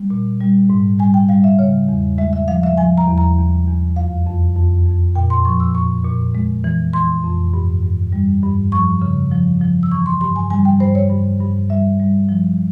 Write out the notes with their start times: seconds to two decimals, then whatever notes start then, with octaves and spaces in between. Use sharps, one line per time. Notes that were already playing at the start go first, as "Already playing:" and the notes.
Already playing: G3
0.10 A#2
0.40 G3
0.70 G#2
0.99 G3 G#5
1.14 G5
1.29 G3 F5
1.44 E5
1.59 C#3 C#5
1.89 E2
2.18 G#3 E5
2.33 E5
2.48 F3 F5
2.63 E5
2.77 F3 G#5
2.98 A#5
3.07 E2
3.18 A#5
3.38 E2
3.67 E2
3.96 F2 F5
4.27 F2
4.56 F2
4.86 F2
5.15 A#2 G5
5.30 C6
5.45 F3 C#6
5.60 E6
5.75 A#2 C#6
6.05 A#2
6.35 G#3
6.64 E3
6.93 E3 C6
7.24 F2
7.54 G2
7.83 G2
8.12 G3
8.43 G2
8.72 F3 C#6
9.02 C#3
9.32 F3
9.61 F3
9.83 E6
9.91 E3 C#6
10.06 C6
10.21 G2 C6
10.36 G#5
10.50 G3 G#5
10.65 G5
10.80 G2 C5
10.95 C#5
11.10 G2
11.40 G2
11.70 G3 E5
11.99 G3
12.29 F3